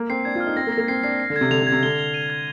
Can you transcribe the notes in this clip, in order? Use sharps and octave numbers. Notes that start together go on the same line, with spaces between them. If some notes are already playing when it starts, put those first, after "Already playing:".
Already playing: A#3
C4 C7
D4 G#6
F4
F6
D#4
C4 A#6
A#3
A#6
A#3
C4 C7
D4 C7
C7
D3
G#6
C3
D3 F7
D3
G#6
C3
D3 G7
G7
D#7
G#6